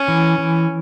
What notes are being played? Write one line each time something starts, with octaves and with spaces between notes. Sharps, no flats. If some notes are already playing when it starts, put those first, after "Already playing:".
Already playing: C#4
E3
E3